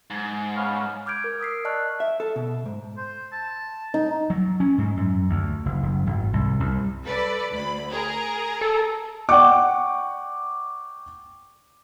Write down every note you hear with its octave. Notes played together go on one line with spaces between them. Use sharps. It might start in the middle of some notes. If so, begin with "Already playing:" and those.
G#2
B3 C#4 F5
D6 F6 G6 G#6 D7
A#4
D#6 E6 B6 C7
D5 D#5 A5 C#6 F6 F#6
E5
A4
B2
G#2
C5
A5
D#4
F#3
C#4
G#2
F#2
D2
F#1
F#1
G#1
C2
C2
A4 B4 D5
D2 B5
G#4 A#4 A#5
A4
D5 F#5 G5 C#6 D6